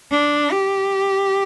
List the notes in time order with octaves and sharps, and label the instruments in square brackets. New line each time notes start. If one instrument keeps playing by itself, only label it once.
[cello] D4
G4